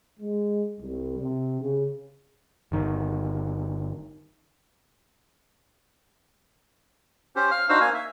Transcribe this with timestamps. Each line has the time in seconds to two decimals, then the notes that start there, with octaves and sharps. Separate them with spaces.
0.19 G#3
0.79 C2
1.17 C3
1.60 C#3
2.72 G1 D#3
7.36 C#4 G4 C5
7.51 F5 F6
7.69 D4 D#4 F#4 C5 F5 E6
7.81 A#3 F5 G#5
7.95 E5